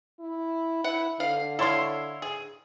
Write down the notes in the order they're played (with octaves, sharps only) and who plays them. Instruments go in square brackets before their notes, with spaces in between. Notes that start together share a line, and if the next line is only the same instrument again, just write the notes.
[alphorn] E4
[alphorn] E4 [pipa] F#5
[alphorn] D3 [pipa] F5
[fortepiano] E4 C#5 C6 [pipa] A4 F5
[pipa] G#4